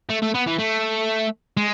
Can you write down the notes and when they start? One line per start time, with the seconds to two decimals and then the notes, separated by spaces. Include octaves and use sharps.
0.09 A3
0.22 A3
0.34 B3
0.46 E3
0.58 A3
1.57 G#3